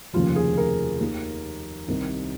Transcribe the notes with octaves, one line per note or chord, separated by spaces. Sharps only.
F1 D#2 C#3 F3 F4
G#4
A#4
D#2 D#3
C2 C3 D#3